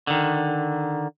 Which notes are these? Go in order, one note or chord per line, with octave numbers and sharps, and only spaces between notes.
D3 D#3